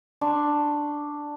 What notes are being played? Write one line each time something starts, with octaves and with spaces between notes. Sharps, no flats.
D4 C6 C#6